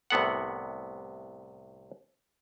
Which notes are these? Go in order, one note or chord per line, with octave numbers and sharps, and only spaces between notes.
C2 A2 C3 B3 A4 F#5